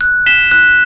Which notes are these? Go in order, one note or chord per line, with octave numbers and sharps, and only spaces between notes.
F#6
B6 E7 G7
F#6